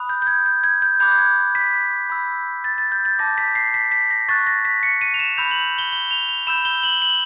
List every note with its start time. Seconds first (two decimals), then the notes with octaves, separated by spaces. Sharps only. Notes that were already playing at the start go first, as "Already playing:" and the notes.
Already playing: B5 D#6 F#6
0.09 G6
0.22 G6
0.27 G#6
0.46 G6
0.64 G#6
0.82 G6
1.00 B5 D6 F#6 G6
1.12 G6
1.18 G#6
1.55 B6
2.10 B5 E6 G6
2.64 A6
2.78 A6
2.92 G6
3.05 A6
3.19 A5 D6 G6 A#6
3.38 B6
3.55 C7
3.74 B6
3.91 B6
4.10 A#6
4.29 C#6 F#6 A6
4.47 A#6
4.65 B6
4.83 C#7
5.01 D#7
5.14 F7
5.19 E7
5.38 B5 E6 G6 F7
5.51 F#7
5.78 G7
5.92 G7
6.11 F7
6.29 F7
6.47 B5 E6 G6 E7
6.65 G7
6.83 F#7
7.02 F#7